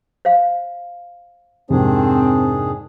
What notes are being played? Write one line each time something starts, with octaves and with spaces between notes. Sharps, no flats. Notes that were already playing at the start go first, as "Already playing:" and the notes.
C5 F5
F2 G#2 C3 D#3 C4 D4 G#4